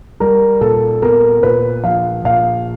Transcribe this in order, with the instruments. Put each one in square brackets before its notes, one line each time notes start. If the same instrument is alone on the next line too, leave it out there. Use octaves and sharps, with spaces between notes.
[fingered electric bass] G3 [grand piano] A#4
[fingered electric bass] A#2 [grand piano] A4
[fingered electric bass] B3 [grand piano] A#4
[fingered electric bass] A#2 [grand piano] B4
[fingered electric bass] F3 [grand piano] F5
[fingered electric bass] A#2 [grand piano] F5